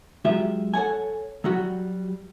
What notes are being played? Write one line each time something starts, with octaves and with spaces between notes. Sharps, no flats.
F#3 G#3 F4 G4 E5
A4 C#5 F#5 G#5
F#3 G3 F#4